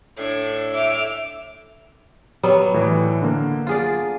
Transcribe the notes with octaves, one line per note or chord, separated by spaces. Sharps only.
A2 D4 G#6
E5 D6 F7
F#3 G3 B3
A2 E3
D3 A#3
F4 G#4 D5